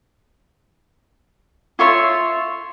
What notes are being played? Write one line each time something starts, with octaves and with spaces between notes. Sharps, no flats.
F4 C#5 E5 C6